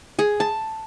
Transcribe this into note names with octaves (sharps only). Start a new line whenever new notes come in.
G#4
A5